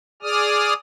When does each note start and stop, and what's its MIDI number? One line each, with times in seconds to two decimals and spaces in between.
0.22 0.73 68
0.22 0.73 74
0.22 0.73 87
0.22 0.73 89